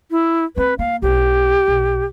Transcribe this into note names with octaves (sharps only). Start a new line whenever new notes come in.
E4
A#3 C4 B4
A#3 F5
B1 B3 G4
B1